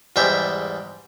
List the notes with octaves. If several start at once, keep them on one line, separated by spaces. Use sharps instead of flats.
E2 G#2 G3 E5 G5